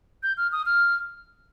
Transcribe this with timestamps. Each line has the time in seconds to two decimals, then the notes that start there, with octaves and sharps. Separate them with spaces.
0.23 G6
0.37 F6
0.52 D#6
0.66 F6